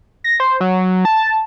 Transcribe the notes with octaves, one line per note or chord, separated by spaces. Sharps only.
A#6
C5
F#3
A5